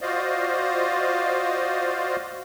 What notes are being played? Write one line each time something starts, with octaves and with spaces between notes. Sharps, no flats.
F4 F#4 C5 D5 D#5 F5